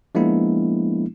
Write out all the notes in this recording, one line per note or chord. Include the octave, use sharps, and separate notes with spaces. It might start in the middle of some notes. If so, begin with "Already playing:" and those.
F3 G#3 A#3 B3 D4 E4